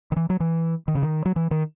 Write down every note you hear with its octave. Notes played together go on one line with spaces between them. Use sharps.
D#3
E3
F#3
E3
D#3
C#3
D#3
F#3
E3
D#3